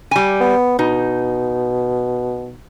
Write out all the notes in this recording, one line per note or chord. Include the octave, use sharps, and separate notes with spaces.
G3 G#5
B3
B2 D#4